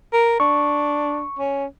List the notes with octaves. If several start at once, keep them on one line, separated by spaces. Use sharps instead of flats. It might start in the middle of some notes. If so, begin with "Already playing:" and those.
A#4
D4 C#6
C#4